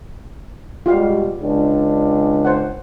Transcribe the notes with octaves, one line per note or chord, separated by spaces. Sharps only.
B2 G3 G#3 F4 G4 F5
C#2 D4
C5 F#5